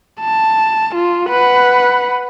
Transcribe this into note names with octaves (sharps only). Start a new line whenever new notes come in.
A5
F4
B4 F#5